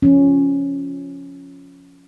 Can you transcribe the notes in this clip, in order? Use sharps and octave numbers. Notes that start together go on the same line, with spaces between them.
F3 C#4